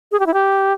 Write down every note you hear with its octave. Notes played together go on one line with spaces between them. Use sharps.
G#4
G4
E4
G4